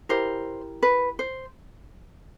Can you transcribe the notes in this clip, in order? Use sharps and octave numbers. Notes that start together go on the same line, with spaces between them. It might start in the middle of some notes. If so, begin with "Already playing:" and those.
E4 G4 A#4 C5
B4
C5